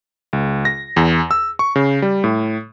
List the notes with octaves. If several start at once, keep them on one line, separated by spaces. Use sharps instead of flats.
C#2
A#6
E2
E6
C#6
C#3
G3
A2